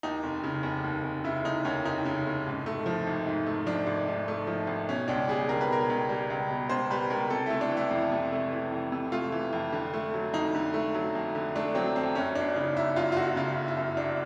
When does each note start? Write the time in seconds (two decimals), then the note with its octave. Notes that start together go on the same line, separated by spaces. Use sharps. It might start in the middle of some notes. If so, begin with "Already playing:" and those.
0.03 D#2 D#4
0.23 F1
0.44 C#3
0.63 F1
0.84 D#2
1.04 F1
1.24 C#3 E4
1.44 F1 D#4
1.65 D#2 C#4
1.85 F1 D#4
2.05 C#3
2.26 F1
2.46 G#2
2.66 A3
2.86 F3
3.07 G#1
3.27 G#2
3.47 A3
3.66 F3 D4
3.87 G#1
4.08 G#2
4.28 A3
4.47 F3
4.67 G#1
4.89 B2 C#4
5.08 C#2 D4
5.28 G3 G#4
5.49 C#2 A#4
5.61 B4
5.70 B2 A#4
5.90 C#2
6.09 G3
6.30 C#2
6.50 B2
6.69 C#2 C5
6.90 G3 B4
7.10 C#2 A#4
7.30 C3 A4
7.46 A3 E4
7.61 D4
7.71 E3
7.77 E4
7.91 F2
8.11 C3
8.32 A3
8.52 E3
8.72 F2
8.92 C3
9.12 A3 F4
9.32 E3
9.53 F2
9.73 D3
9.94 A3
10.14 F#3
10.33 F2 D#4
10.55 D3
10.74 A3
10.95 F#3
11.15 F2
11.35 D3
11.56 A3 D4
11.75 F#3 C4
11.96 F2 C4
12.15 F#2 C#4
12.35 G1 D4
12.56 C#3 D#4
12.76 G1 E4
12.96 F#2 F4
13.12 F4
13.16 G1 F#4
13.36 C#3 F4
13.57 G1
13.68 E4
13.77 F#2
13.97 G1 D4